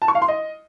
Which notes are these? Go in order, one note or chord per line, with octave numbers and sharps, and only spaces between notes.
A5
C#6
F5
C6
D#5